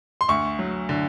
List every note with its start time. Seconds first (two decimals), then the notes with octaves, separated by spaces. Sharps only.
0.21 C6
0.28 D2 C#6
0.59 F#3
0.89 D3